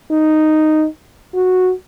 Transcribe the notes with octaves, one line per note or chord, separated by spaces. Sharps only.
D#4
F#4